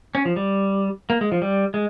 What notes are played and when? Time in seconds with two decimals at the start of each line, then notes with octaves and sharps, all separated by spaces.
0.15 C#4
0.25 F3
0.36 G3
1.10 A#3
1.21 G#3
1.32 F3
1.42 G3
1.74 G#3